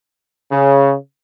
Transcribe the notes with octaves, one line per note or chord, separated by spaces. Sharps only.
C#3